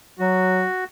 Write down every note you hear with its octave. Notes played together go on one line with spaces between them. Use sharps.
F#3 F#4